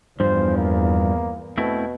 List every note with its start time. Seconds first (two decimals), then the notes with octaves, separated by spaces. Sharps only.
0.20 E2 G2 F3 C5
0.57 A#3
1.58 B2 A3 C4 E4